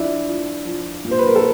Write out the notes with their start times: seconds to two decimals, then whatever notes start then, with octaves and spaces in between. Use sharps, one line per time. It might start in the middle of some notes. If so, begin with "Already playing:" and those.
Already playing: F3 D4 E4
0.26 F3
0.65 F3
1.05 A#2
1.11 C5
1.19 B4
1.27 A#4
1.36 A4